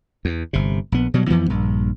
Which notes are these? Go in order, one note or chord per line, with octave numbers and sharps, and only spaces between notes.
E2
G1 C3
A#1 B3
B2 F#3 G3
F2 E3 F3 B3
A#1 G2